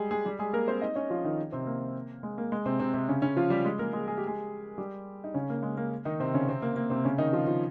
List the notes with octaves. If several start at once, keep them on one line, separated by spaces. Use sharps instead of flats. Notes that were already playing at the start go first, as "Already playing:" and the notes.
Already playing: G3 G#3 G4 G#4
G#3 G#4
G3 G4
G#3 G#4
A#3 A#4
C4 C5
D#4 D#5
C#4 C#5
F3 F4
D#3 D#4
C3 C4
A#3
G#3
A#3
G#3
C3 C4
C3 C4
C3 C4
C#3 C#4
C#3 C#4
F3 F4
G3 G4
G#3 G#4
A#3 A#4
G#3 G#4
G#4
G4
G#3 G#4
G3 G4
D#4
C#3 C#4
A#3
G#3
A#3
D#3 D#4
C3 C4
C#3 C#4
C3 C4
A#3
A#3
C3 C4
C#3 C#4
D#3 D#4
F3 F4
F3 F4